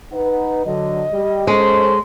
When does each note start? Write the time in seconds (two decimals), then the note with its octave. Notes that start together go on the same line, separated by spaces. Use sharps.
0.13 D#4 B4 F#5
0.65 D3 F#3 D#5
1.12 G3 G4
1.47 G#3 C#4 A4 C5